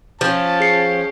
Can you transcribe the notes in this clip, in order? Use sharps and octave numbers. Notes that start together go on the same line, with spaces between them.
F3 C#4 G4 A5
G#4 C7 C#7